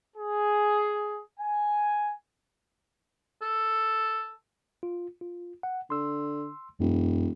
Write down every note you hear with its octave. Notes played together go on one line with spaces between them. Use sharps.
G#4
G#5
A4
F4
F4
F#5
D3 C6 E6
E1 F#2